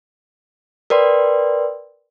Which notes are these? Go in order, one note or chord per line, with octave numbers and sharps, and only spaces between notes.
A#4 B4 D5 G5 C6